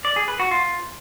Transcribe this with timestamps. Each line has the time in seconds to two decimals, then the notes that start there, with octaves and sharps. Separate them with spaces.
0.05 D5
0.16 G#4
0.28 B4
0.40 F#4
0.51 F4